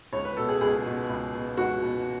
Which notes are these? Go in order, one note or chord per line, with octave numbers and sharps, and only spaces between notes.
C#2 C#5
B4
B2 A4
G#4
C#2 G#4
B2
C#2
B2
C#2 F#4
B2